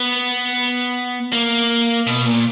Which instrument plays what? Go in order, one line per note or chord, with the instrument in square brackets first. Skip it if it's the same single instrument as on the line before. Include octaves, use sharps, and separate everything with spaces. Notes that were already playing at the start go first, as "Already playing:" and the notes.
Already playing: [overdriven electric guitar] B3
A#3
B2
A#2